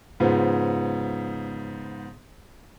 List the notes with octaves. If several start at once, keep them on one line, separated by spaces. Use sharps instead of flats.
G#2 C#3 F3 B3